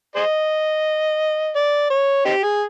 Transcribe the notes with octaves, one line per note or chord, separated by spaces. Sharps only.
G#4 C5 D#5
D5
C#5
C4 D#4 G4
G#4